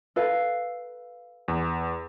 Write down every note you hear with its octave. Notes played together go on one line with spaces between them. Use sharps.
A4 B4 F5
E2